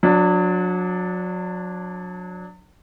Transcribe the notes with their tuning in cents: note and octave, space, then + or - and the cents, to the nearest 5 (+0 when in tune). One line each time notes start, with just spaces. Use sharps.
F#3 -30 D4 +0